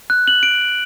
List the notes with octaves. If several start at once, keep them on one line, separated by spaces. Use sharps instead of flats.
F#6
F#7
D7